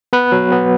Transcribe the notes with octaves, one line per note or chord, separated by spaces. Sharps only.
B3 B4
F#3
B3